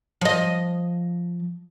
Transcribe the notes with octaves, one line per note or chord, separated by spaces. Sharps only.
F3 D#5